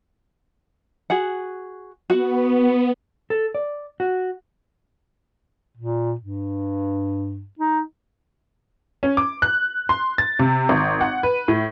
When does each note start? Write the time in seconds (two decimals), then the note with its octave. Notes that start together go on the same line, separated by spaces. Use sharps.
1.10 F#4 G#4 F#5
2.10 B3 F#4 F#5
3.30 A4
3.55 D5
4.00 F#4
5.77 A#2
6.21 G2
7.59 D#4
9.03 C#4
9.17 D6
9.42 F#6
9.89 C6
10.18 A6
10.39 C3
10.69 G#1
11.01 F#5
11.23 B4
11.48 A2